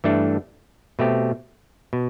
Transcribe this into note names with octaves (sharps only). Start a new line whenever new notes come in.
G2 E3 A3 D4 A4
B2 A3 C4 G4
B2